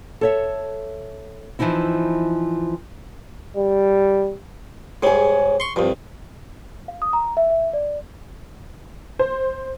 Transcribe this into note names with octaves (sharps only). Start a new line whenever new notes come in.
A4 C#5 E5
E3 F3 C4 D#4 E4
G3
G#2 G3 G#4 C#5
C6 C#6
C2 G2 F3
F5
D#6
A#5
E5
E5
D5
C5